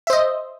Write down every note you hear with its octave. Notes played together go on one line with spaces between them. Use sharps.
C5 D#5 E5